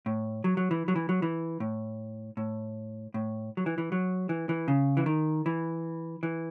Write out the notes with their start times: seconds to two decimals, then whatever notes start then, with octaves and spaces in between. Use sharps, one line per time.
0.06 A2
0.44 F#3
0.57 F#3
0.71 E3
0.88 F#3
0.96 E3
1.09 F#3
1.22 E3
1.60 A2
2.37 A2
3.14 A2
3.57 F#3
3.66 E3
3.78 E3
3.92 F#3
4.29 E3
4.49 E3
4.68 C#3
4.97 E3
5.06 D#3
5.46 E3
6.23 E3